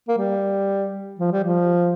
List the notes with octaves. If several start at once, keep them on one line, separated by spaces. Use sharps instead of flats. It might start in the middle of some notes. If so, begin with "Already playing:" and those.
A#3
G3
F3
G3
F3